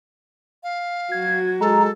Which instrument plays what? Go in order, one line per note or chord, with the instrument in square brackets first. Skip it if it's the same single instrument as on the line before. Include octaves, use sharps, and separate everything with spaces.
[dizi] F5
[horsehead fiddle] F#3 F#4 [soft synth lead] G#6
[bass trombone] G#3 [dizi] A4 [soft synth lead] A#5